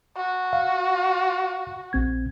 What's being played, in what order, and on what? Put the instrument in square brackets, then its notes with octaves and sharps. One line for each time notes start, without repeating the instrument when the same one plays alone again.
[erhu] F#4
[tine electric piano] F5
A#1 C4 G#6